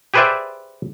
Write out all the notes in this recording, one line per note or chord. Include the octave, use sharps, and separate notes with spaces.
G4 G#4 B4 C5 D5 E5